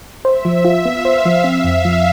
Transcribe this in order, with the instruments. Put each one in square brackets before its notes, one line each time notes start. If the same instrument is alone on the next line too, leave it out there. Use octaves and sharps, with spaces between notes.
[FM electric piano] C5 [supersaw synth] E5
[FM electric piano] F3
F4
[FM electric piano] B3 [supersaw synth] F5
[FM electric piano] C5
[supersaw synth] F5
[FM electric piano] F3
[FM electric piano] C4 [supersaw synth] E5
[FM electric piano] F2
[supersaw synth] F5
[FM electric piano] F3